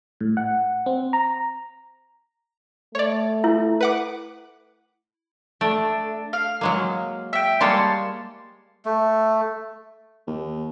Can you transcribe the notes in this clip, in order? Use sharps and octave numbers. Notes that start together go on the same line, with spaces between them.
A2
F#5
C4
A#5
A3 C#5 D5
E4
B4 F#5 D6
A3 D4
F5
F#3 G#3 A#3
E5 G5
G3 G#3 A#3 C#5 A5 C6
A3
D#2